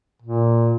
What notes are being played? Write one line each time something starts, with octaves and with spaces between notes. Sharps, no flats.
A#2